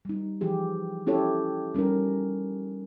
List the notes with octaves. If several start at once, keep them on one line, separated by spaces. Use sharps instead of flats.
G3 D#4
E3 F3 G4 G#4
C#4 E4 G4 A4 C#5
G3 C#4 D#4 A#4